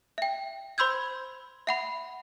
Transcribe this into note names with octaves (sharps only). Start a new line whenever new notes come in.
E5 G5
C5 B5 C6 E6 G6 G#6
E5 F#5 B5